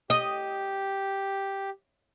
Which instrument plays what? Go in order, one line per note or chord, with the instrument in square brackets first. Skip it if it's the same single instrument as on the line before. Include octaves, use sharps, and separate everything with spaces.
[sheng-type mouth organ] G4 [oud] D#5